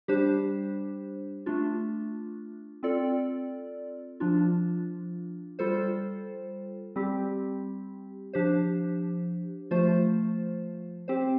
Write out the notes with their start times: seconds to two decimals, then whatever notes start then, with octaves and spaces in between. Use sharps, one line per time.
0.08 G3 D4 G4 C5
1.46 A3 D4 F4
2.83 C4 F4 A4 D5
4.20 F3 D4 F4
5.59 G3 F4 A4 C5
6.96 G3 C4 G4
8.33 F3 D4 G4 C5
9.71 F3 A3 F4 C5
11.08 C4 G4 C5